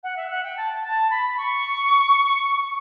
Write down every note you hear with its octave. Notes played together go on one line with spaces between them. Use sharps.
F#5
E5
F#5
G5
A5
A5
B5
C#6